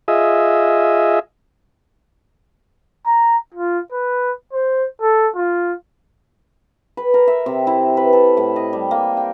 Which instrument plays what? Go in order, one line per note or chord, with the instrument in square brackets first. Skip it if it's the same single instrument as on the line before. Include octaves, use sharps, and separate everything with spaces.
[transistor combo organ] F4 G#4 D#5 E5
[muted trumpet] A#5
F4
B4
C5
A4
F4
[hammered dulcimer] B4
A#4
E5
C3
E4
B4
A4
A2
D#5
G3
A#3
G5